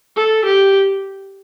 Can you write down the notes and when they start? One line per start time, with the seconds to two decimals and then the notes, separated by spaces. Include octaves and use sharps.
0.16 A4
0.45 G4